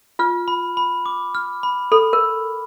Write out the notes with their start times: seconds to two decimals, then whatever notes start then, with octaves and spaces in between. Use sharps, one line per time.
0.19 F4 F6
0.48 B5
0.77 B5
1.06 D6
1.35 F6
1.63 B5
1.92 A4 B5
2.13 A#4